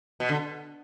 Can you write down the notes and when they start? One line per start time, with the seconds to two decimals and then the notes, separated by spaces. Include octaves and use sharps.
0.20 B2
0.29 D3